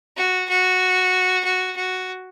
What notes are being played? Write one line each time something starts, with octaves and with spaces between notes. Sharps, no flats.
F#4
F#4
F#4
F#4